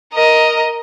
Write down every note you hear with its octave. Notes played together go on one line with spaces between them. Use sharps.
A#4 D#5